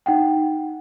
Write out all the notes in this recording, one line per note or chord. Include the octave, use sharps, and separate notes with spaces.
D#4 F#5 G5